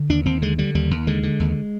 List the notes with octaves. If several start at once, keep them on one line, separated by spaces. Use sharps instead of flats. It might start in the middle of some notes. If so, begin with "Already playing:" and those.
Already playing: D3
D#2 D4
D#2 C4
D3 G#3
D3 G3
D#2 G3
D#2
D3 G#3
D3
D#2